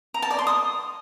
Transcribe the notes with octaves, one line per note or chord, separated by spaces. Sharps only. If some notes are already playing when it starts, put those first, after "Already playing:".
A#5
A5
D5
C6
D#6